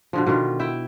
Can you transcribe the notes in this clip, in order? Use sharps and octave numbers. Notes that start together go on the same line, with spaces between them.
B2 D3 F3
B2 D3 D#3 F4
E4 E5 G5